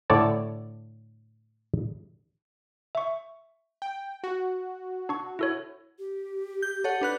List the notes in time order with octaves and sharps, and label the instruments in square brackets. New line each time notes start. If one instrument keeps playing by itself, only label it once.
[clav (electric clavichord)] A2 D3 C#5 D5 A5
[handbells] E5 C#6
[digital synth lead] G5
F#4
[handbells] D4 C#6
E4 A4 C#5
[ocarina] G4
[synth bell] G6
A4 C#5 F#5
D4 B4 F#6